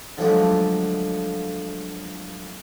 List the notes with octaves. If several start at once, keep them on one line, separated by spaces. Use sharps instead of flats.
D3 F3 F#3 G#3 A3 D4